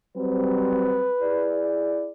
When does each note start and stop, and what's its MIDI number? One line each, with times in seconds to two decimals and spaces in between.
0.17 1.11 54
0.17 1.11 55
0.17 1.11 60
0.17 1.74 71
1.21 2.12 64
1.21 2.12 68
1.21 2.12 74